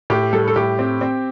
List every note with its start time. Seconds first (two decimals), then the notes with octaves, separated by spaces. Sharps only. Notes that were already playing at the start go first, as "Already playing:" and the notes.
0.10 A2 G4
0.33 G3 A4
0.48 A4
0.56 A2 G4
0.79 C4
1.01 C4